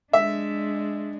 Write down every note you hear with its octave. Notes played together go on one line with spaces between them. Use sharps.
G#3 D4 E5